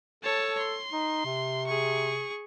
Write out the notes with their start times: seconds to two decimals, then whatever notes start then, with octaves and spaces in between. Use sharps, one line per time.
0.23 A4 C#5 A5
0.59 C6
0.91 D#4
1.25 C3
1.67 G#4 C#6